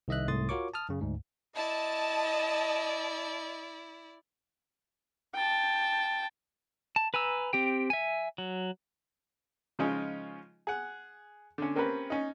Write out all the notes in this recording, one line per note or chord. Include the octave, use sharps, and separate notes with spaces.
C2 D#3 D#5 E5 F#6
C2 G#2 A3 C6 D#6 A6
F4 F#4 A#4 C#5 C#6 D6
A5 D#6 F6
F#2 C#3
D2 G#2
E4 D5 D#5 A5
G5 A5
A5
B4 G#5 A#5 E6
C4 G4 G5
E5 G#5
F#3
C#3 F3 G#3 C#4 D#4 F4
G#4 F#5
D3 C#4
A#3 C4 C#4 G4 A#4 B4
C#4 D#4